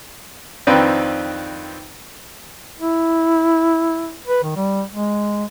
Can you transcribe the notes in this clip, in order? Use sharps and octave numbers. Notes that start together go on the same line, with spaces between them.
F2 D#3 C4 D4 B4 G5
E4
B4
D#3
G3
G#3